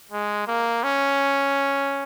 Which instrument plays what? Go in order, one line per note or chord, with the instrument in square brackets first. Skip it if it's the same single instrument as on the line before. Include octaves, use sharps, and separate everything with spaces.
[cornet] G#3
A#3
C#4